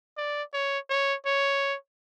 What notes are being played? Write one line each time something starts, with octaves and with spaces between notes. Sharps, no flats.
D5
C#5
C#5
C#5